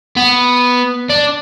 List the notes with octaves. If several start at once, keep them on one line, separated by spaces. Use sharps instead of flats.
B3
D4